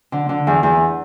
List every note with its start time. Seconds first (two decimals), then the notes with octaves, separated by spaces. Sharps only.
0.12 D3
0.29 D3
0.47 E2
0.63 E2